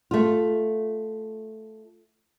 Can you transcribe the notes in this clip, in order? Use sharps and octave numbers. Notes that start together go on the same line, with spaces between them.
A3 F4